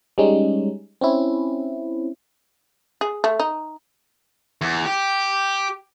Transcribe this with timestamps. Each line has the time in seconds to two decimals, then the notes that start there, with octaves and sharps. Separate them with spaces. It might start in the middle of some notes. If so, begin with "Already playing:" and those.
0.18 G3 G#3 C#4 D#4
1.01 C4 C#4 E4
3.01 G#4
3.24 A3
3.40 D#4
4.61 E2
4.85 G4